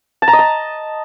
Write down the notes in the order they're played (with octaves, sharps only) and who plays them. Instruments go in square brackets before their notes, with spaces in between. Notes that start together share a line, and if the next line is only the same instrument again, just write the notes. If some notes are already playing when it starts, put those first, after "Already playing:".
[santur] A5
A#5
D#5
A5